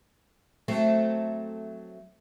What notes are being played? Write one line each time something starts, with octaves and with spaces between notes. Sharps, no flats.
F#3 A3 C4